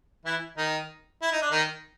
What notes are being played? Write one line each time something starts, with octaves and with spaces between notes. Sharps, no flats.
E3 E4
D#3 D#4
E4
D#4
D4
D#3 D#4